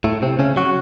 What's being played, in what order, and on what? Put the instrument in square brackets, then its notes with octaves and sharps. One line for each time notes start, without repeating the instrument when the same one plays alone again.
[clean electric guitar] A2 A3
C3 C4
C#3 C#4
F#3 F#4